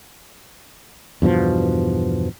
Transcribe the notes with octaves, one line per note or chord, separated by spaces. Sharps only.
E2 G2 B2 F3